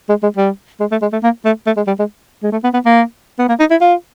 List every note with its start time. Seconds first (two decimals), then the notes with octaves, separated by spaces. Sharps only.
0.09 G#3
0.23 G#3
0.37 G3
0.80 G#3
0.91 A3
1.02 G#3
1.12 A3
1.23 A#3
1.45 A3
1.66 A3
1.77 G#3
1.87 G3
1.99 G#3
2.43 G#3
2.52 A3
2.64 B3
2.74 B3
2.85 A#3
3.39 B3
3.49 A#3
3.59 D#4
3.71 E4
3.81 F4